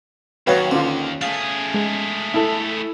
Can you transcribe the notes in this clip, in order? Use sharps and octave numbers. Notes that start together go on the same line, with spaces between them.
D#2 F#3 B3 B4 C#5 F5 G5
D3 C#4 F4 C5
A3 G#4 F5
G#3
E4 A4